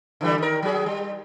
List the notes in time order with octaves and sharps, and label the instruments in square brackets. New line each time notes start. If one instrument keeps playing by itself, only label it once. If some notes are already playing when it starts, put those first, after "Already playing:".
[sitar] D3 E3 G3
D#3 A#4
F#3 G#4
G3